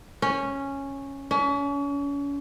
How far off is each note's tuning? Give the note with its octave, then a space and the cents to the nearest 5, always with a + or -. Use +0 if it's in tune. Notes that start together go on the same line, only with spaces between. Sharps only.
C#4 -5
C#4 +35